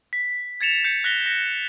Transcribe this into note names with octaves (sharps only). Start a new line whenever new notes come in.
B6
G#6 A6 C#7 E7 F7
G6 C#7
F#6 A#6 B6 F7 G7
A#6